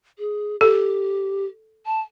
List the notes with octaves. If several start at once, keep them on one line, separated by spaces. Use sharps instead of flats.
G#4
G4 A4
A5